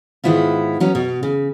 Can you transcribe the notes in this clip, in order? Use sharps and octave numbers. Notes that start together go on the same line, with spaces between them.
G#2 D#3 B3 E4 F4
F#3 B3 C#4
B2
C#3